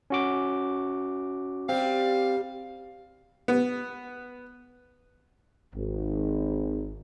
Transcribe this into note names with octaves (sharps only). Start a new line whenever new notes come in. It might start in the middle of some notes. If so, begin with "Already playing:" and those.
C#4 F#4 D6
G3 C4 G4 F5
B3
G#1